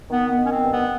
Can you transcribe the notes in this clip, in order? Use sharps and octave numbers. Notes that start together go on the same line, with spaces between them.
D#3 B3
B3
D#3
C#4
C4
G2
B3